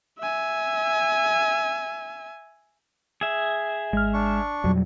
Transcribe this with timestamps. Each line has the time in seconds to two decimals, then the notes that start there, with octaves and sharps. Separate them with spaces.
0.20 E5 G#5
3.21 G#4 E5
3.93 G#1 G#3 F6
4.14 D4 C#6
4.64 F2 B2 F#3 G3